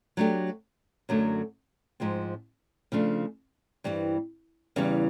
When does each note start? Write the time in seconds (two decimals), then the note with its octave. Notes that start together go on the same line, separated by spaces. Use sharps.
0.17 F#3 A3 D4 G4
1.09 F#2 D3 F#3 A3
2.00 G#2 F3 G#3 C4
2.92 C#3 F3 A3 D4
3.84 G2 E3 G3 C4
4.76 E2 C#3 E3 G3